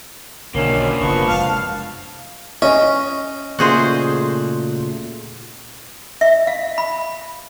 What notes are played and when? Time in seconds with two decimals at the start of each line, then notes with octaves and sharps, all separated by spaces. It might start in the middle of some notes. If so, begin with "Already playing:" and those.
0.54 B1 D3 D#3 F#3 A#3 C#4 D4
1.01 F#1 F3 B3 C#6
1.28 F1 C2 G#3 F5 A5
2.62 C#4 D#5
3.59 A#2 C#3 A3 F#4 G#4 C5
6.21 E5
6.47 F5
6.78 B5